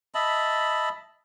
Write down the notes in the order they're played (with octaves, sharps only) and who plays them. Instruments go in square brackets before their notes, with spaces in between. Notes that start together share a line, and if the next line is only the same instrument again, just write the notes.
[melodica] D#5 E5 A5 B5